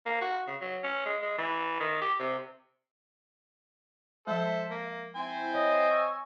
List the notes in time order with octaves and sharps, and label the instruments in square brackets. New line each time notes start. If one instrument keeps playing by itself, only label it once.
[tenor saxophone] A#3
F#4
C#3
F#3
C#4
G#3
G#3
E3
D#3
G4
C3
[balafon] F3 G#3 [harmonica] A4 C5 [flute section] E5
[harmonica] A#3
[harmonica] C4 C5 G#5 [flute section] E4
[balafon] C#5 [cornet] D#5
[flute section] C#6 E6